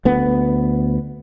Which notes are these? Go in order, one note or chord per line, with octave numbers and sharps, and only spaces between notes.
D2 B3